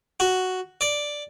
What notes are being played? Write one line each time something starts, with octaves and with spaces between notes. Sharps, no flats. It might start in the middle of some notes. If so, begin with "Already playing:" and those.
F#4
D5